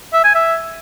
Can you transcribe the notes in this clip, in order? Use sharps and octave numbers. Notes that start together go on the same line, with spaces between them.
E5
G#5
E5